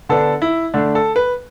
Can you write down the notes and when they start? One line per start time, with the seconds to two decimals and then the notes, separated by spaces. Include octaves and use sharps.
0.09 D3 B3 D4 A4
0.42 E4
0.74 D3 A3 D4
0.95 A4
1.16 B4